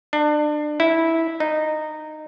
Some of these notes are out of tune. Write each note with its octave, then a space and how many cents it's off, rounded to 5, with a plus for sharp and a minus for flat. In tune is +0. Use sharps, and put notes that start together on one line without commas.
D4 +30
E4 -10
D#4 -15